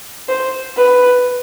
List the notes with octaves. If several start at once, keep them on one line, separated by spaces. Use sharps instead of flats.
C5
B4